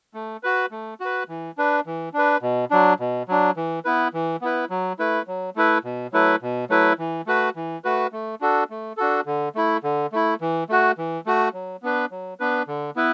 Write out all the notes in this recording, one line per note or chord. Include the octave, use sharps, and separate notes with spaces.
A3
F#4 B4
A3
F#4 B4
E3
D4 B4
E3
D4 B4
B2
F#3 D4
B2
F#3 D4
E3
B3 E4 B4
E3
B3 E4 B4
F#3
A3 E4 B4
F#3
A3 E4 B4
B2
F#3 A3 E4 B4
B2
F#3 A3 E4 B4
E3
A3 F#4 B4
E3
A3 F#4 B4
A3
D4 F#4 A4
A3
D4 F#4 A4
D3
A3 E4
D3
A3 E4
E3
A3 F#4
E3
A3 F#4
F#3
B3 D4 B4
F#3
B3 D4 B4
D3
B3 E4 B4